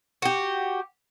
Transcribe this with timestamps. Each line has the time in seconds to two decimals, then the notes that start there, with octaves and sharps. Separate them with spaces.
0.22 F#4 G4